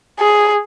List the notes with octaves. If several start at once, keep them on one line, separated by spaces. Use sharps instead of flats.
G#4